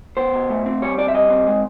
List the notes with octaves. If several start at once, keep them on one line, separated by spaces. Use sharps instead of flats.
B3 C5
B2
A3
C4
G3 C#5
C4 D5
E5
G3 D#5
C4
G#3